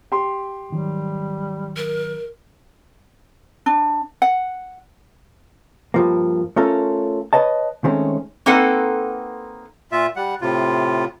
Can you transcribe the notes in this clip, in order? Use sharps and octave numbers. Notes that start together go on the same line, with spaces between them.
G4 C6
G#2 D#3 F#3 G3
A#4
D4
F#5
G2 F3 A#3
A3 C#4 F4 A4 A#4
B4 C#5 D#5 A5
D#3 G#3 A3 C4 C#4
A#3 C4 D#4 A4 B4 F#5
A#2 F4 E5
G3 F#5
A2 C3 F4